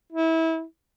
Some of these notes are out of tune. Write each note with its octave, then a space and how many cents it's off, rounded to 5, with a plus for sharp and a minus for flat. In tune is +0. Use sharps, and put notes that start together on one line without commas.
E4 -25